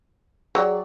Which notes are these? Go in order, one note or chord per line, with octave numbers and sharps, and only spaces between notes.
F#3 G4 G#4 D5